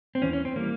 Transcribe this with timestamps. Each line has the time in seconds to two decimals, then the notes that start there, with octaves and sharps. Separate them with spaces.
0.15 C4
0.22 E2 E3 C#4
0.33 C#4
0.45 C4
0.56 E3 G3 A#3